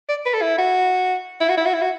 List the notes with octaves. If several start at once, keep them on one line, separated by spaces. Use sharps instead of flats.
D5
B4
A4
E4
F#4
E4
F#4
E4
F#4
E4
F#4